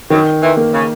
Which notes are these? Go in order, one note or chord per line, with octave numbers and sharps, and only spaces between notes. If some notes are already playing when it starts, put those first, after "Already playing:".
F#2 D#3 F#3
E2 E3
A#3
C#3